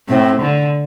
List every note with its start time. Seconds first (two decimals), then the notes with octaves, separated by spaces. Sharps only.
0.08 A2 C4
0.41 D3